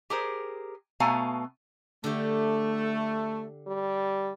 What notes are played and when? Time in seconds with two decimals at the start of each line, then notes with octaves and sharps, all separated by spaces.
0.10 G4 G#4 A#4 C5
1.00 B2 A3 B3 F5 G#5 A#5
2.04 D3 A3 G4
3.67 G3